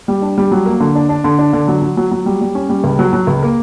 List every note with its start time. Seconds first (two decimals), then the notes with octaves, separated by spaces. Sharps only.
0.08 G3
0.22 D4
0.38 G3
0.52 F#3
0.66 A#3
0.80 D3
0.95 D4
1.09 D4
1.24 D3
1.39 D4
1.53 D3
1.68 F#3
1.82 F#3
1.97 F#3
2.12 F#3
2.26 G3
2.41 G3
2.55 C#4
2.69 G3
2.84 C#2
2.99 F#3
3.13 F#3
3.27 C#2
3.43 A#3